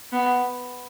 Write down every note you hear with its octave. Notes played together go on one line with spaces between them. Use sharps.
B3